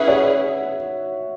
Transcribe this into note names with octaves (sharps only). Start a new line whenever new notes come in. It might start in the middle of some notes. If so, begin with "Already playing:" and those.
Already playing: C#4 E4 G#4 B4 E5 F#5
C#5